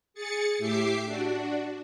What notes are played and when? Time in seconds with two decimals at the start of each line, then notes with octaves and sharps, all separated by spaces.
0.14 G#4 A6 C#7
0.58 A2 G4 E5 D6 C7
1.04 D4 F#4